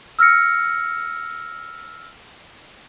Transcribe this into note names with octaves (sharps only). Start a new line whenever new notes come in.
E6 F6 A#6 C#7